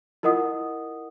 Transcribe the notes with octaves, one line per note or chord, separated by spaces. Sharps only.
E4 F4 A#4 D#5 F#5 D#6